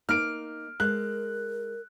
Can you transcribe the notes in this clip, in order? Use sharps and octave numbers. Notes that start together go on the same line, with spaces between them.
A#3 D#4 F6 D7
G#3 A#4 F#6